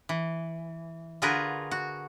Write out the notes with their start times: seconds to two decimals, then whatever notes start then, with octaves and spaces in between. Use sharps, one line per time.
0.09 E3
1.22 D3 F4 F#4 G#4 A#4 B4
1.71 F#4